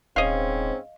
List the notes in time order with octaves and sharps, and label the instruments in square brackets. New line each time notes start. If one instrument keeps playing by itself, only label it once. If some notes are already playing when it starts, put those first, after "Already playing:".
[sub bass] D#1 [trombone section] G#2 C4 [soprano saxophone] C#4 [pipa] D#5 F5